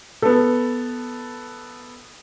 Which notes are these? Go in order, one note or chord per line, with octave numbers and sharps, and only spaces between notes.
B3 A4